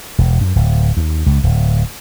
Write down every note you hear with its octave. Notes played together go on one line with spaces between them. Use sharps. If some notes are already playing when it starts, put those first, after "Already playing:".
E1
F#2
D1
D#2
C#2
D1